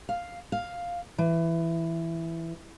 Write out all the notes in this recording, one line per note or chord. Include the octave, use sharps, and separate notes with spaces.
F5
F5
E3